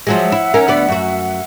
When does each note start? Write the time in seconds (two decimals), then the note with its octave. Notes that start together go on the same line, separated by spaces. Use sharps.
0.07 F3 F#3 G#3 E5 F#5 E6
0.32 E4
0.54 C#4 D#4 A#4
0.68 D2 B3 D5
0.88 F#2 F#4